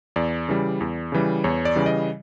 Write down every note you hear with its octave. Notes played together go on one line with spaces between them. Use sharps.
E2 D5
C#3 E3 G3
E2
C#3 E3 G3
E2 C#5
D5
C#3 E3 G3
D#5